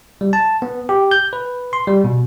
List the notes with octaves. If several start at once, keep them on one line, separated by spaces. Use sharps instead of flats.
G3
A5
B3
G4
G6
B4
C6
G3
B2